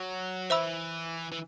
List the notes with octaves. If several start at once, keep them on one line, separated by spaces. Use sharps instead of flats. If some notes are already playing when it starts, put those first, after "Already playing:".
Already playing: F#3
E3 C5 E5 B5 E6
E3